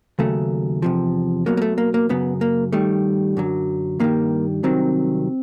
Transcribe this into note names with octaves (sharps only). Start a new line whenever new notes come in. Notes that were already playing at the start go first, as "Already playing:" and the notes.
D#2 C#3 F#3 A3
E2 C3 F3
B1 B2 F#3 A#3
A#3
A3
A#3
A#3
F#2 C#3 F#3 B3
A#3
G2 D#3 G3 A3
F#2 D3 F#3
G2 D#3 G3 A#3
C2 C3 D#3 F#3 C4